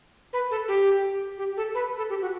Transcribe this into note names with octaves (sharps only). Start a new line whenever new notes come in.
B4
A4
G4
G4
A4
B4
A4
G4
F#4